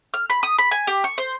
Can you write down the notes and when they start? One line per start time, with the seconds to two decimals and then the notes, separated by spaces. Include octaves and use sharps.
0.14 F6
0.30 B5
0.43 D#6
0.58 B5
0.71 G#5
0.87 G4
1.04 C#6
1.18 C5